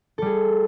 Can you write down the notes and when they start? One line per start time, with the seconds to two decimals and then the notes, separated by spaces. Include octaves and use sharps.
0.18 A4
0.22 G3
0.26 G#4